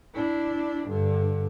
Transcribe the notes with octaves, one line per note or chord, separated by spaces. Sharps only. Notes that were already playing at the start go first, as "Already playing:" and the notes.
D4 E4
G2 D3